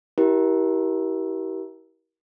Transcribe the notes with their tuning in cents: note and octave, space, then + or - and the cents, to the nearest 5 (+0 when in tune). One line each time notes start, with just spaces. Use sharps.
E4 -20 G4 -30 A#4 +30